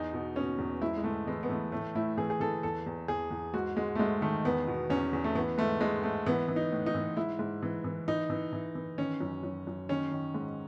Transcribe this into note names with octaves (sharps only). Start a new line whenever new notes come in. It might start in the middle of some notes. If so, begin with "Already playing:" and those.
Already playing: E2 D#4
B2
B2 C#4
E2
G#2 E4
G#3
G#2 A3
E3 G#3
B3
E3 A3
A2 A3
A2 E4
E3 G#4
G#4
E3 A4
E2 A4
E2
E2 G#4
E2
G#2 F#4
G#2 G#3
A3
G#2 G#3
D#3 A3
E2 B3
B2
E2 C#4
E2
A3
E3 B3
G#2 A3
G#2 G#3
G#2 A3
E3 B3
E3
D#4
A2
D#4
E3
G#2 E4
G#2
E3
E3
E3 D#4
E3
E3
E3
D#3 C#4
F#2
F#2
F#2
D#3 C#4
D#3
G#2